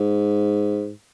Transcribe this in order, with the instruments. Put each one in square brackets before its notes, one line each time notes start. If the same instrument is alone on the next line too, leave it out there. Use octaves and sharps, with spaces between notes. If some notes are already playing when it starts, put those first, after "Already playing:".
Already playing: [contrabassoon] G#2